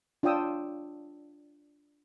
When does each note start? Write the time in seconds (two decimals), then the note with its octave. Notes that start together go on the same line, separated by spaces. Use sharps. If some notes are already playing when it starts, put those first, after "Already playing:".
0.23 D4 F4 C#5 G5 D#6 E6